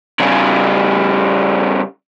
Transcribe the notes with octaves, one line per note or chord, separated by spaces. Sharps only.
C#3 G3